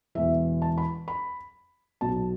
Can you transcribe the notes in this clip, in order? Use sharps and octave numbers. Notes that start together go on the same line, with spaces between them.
E1 E2 E3 E5
A5
B5
B5
B1 B2 A5